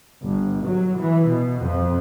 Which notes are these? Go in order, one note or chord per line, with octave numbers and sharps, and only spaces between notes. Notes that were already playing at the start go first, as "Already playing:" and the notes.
G1
F#3
E3
B2
F2